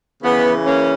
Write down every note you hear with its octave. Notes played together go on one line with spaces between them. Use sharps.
C#3 E3 B3
A#3 C#4